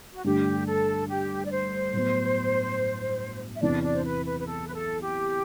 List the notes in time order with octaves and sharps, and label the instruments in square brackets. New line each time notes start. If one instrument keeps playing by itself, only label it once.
[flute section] F#4
[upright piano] G2 D3 A3 [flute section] G4
[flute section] A4
G4
D5
C5
[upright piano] A2 F#3 B3
[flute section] E5
[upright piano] E2 C3 E3 [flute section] D4 D5
[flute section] D4 D5
C5
B4
B4
B4
A4
B4
A4
G4